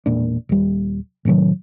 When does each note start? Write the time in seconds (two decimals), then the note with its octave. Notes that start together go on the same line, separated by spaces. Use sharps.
0.06 E1 A#2 D4
0.49 D#1 G3
1.25 A2 C3 D#3 F#3